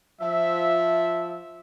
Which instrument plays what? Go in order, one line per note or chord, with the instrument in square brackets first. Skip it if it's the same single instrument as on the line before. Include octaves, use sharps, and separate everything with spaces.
[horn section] F3 E5